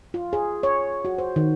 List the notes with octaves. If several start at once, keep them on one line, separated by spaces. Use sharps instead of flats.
F4
G#4
C#5
F#4
C5
D#3